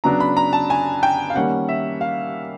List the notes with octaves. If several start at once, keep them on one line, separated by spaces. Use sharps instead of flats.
C#3 F#3 B3 D4 A#5
B5
A#5
A5
G#5
G5
F5
D#3 G3 A#3 C#4 F#5
E5
F5